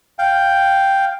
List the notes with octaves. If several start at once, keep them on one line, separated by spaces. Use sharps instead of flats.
F5 G5